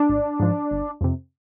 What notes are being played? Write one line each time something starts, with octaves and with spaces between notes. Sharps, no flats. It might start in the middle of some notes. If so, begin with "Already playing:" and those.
Already playing: D4
G#1
G#2 F3
G1
F2 C3